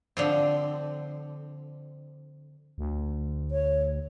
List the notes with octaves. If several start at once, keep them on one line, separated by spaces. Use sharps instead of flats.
D3 F3 C4
D2
C#5